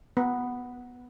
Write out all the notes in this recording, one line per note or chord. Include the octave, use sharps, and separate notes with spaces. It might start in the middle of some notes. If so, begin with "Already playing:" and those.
B3